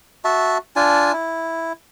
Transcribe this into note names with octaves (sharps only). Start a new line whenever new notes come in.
F#4 E5 A5
D4 F4 G#5 A5
E4